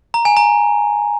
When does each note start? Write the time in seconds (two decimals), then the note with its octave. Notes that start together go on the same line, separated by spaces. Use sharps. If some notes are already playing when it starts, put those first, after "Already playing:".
0.14 A#5
0.25 G#5
0.37 A#5